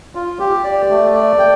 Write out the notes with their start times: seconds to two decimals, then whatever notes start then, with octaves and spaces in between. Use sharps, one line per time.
0.15 F4
0.39 G4
0.64 D5
0.90 A3
1.14 D5
1.39 G5